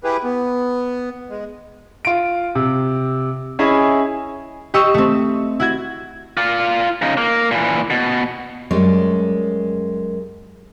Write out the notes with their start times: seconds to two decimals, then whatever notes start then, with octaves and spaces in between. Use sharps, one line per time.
0.04 E4 G4 G#4 B4
0.24 B3
1.30 G#3
2.05 F4 D7
2.55 C3
3.59 C#4 E4 G#4 D#5 E5 G#5
4.74 G4 D#5 C#6 E6
4.94 A3 C4
5.60 E4 F#4 G#6
6.37 F4 D5
7.02 C#3 D#4
7.17 A#3
7.51 A#2 E3
7.90 B2
8.71 F#2 G3 G#3 C#5